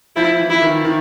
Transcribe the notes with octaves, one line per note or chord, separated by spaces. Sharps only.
F3 E4
E3
E3 E4
D#3
D#3